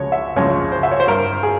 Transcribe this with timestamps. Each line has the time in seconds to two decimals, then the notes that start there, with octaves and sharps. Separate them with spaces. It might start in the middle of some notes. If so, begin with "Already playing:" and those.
Already playing: C#2 C#3 F3 G#3 C#5
0.12 E5
0.36 C#2 C#3 F3 G#3 C#5
0.72 C5
0.83 E5
0.91 C#5
1.00 C5
1.07 G2 G3 A#4
1.43 G#4